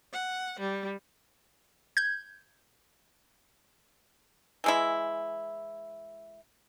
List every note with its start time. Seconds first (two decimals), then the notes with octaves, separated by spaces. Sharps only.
0.13 F#5
0.60 G3
1.97 G6 G#6
4.64 E3 G#3 E4